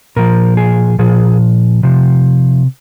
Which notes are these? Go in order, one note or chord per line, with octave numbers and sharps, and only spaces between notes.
A#2 F3 A#4
G#4
A#2 F3 G#4
C3 F3